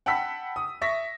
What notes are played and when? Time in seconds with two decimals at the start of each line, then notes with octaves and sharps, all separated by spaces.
0.06 F#5 G5 A5 B5 E6 B6
0.56 D#6
0.81 E5 C#6 A#6 B6